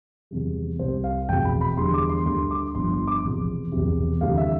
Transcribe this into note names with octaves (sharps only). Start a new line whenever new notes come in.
E2 C3 G3
C2 C3 G3 C5
F5
F1 E2 B2 G5
B5
B5
E2 D3 G3 C6
D6
C6
D2 D3 G3 C6
D6
G1 G2 F3 C6
C6
D6
E1 E2 C3 F3
E1 E2 C3
D2 C3 E3 G3 F5
E5